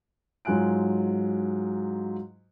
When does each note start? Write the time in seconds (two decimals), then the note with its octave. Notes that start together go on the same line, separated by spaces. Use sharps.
0.45 G#2 F#3 F4 G#5 F#6 D7